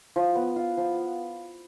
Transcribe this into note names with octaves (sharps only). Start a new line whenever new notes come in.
F3
B3
F4
F3